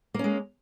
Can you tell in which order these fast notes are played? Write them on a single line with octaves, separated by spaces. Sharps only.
A#3 C#4 G#3